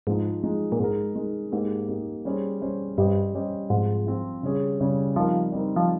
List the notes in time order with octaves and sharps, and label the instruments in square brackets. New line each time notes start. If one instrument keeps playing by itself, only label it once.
[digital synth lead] G#2 [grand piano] F3 G#3 D#4
[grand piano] F3 G#3 D#4
[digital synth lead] A#2
[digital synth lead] G#2 [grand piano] G#3 D#4 A#4
[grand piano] G#3 D#4 A#4
[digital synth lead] G#2 [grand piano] A#3 D#4 G4
[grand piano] A#3 D#4 G4
G3 C#4 G#4 C5
G3 C#4 G#4 C5
[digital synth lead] G2 [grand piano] G3 C#4 G4 C5 D#5
[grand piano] G3 C#4 G4 C5 D#5
[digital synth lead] G#2 [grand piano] F3 C4 F4
[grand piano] F3 C4 F4
C#3 G3 C#4 G#4 C#5
C#3 G3 C#4 G#4 C#5
[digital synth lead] F3 [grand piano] G3 C4 D#4 A#4
[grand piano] G3 C4 D#4 A#4
[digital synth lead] F3